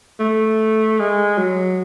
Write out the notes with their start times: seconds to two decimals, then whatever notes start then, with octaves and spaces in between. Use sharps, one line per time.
0.20 A3
0.99 G#3
1.38 F#3